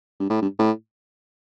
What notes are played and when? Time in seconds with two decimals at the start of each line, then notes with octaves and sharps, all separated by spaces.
0.20 G2
0.30 A2
0.42 G2
0.59 A2